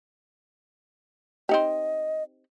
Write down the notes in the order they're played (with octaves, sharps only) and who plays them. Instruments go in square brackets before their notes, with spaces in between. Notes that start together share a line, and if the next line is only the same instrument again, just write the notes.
[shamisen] C4 D#4 G4 [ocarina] D#5